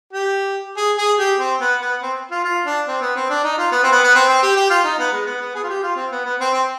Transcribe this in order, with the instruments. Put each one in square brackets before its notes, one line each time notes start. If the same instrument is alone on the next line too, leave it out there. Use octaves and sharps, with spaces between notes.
[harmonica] G4
G#4
G#4
G4
C4
B3
B3
C4
F4
F4
D4
C4
B3
C4
D4
D#4
F4
B3
C4
B3
B3
C4
C4
G4
G4
F4
D#4
B3
G#3
B3
B3
G#4
F4
G4
F4
C4
B3
B3
C4
C4